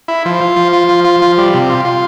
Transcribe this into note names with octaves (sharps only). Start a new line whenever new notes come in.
E4
F3
F4
F3
F4
F3
F4
F3
G3
C3
F4
F4